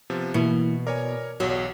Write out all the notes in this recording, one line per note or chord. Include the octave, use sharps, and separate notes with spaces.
C3 F3 B3
B2 E3 A#3 E4 C#7
A#4 C#5 D5 G#5
B1 E2 F#3